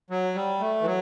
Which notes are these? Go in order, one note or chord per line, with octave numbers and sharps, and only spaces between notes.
F#3
G3
A3
E3
F#3